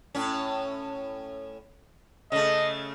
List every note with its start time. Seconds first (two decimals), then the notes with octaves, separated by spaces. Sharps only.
0.15 A2 C#4
2.32 C#3 A3 D#5